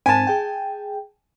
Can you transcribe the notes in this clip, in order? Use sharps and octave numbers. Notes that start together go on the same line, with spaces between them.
G#2 C4 G#5 A5
G#4 G5